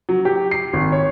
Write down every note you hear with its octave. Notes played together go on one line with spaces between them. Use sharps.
F#3
G4
C7
G#1
C#5